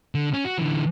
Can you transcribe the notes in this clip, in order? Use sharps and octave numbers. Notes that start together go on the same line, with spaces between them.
D3
C#4
F#4
D3 E3